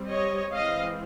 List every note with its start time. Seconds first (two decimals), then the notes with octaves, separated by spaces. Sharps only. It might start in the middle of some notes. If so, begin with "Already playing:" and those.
Already playing: G3 C4
0.10 C#5 D#5
0.53 E3 G#3 C4 D#5 F5